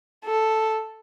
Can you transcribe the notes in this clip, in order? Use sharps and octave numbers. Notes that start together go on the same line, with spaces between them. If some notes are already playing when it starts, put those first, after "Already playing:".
A4